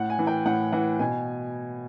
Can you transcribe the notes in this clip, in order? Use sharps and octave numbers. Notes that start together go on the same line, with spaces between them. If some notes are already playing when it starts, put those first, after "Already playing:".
Already playing: A2 F#5
G#5
E3
G5
A2 F#5
E3 F#5
B2 G#5